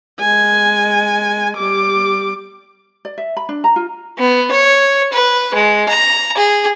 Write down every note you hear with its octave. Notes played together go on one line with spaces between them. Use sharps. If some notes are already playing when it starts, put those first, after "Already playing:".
G#3 G#5
G3 D6
D5
E5
B5
D4
A#5
F4
B3
C#5
B4
G#3
A#5
G#4